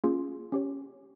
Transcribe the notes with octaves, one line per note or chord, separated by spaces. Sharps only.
A#3 C#4 F4 G#4
C#4 G4 C#5